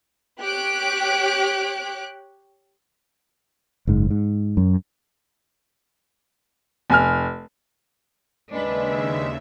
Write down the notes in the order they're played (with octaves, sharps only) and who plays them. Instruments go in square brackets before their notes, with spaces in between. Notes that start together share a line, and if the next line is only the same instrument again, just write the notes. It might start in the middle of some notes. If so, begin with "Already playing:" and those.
[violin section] G4 C#5 F#6 D7
[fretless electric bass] F#1 G#2
G#2
F#2
[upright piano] F1 G#5 F6
[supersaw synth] D#2 C#3 E5 [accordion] G#3 [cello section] D4 B4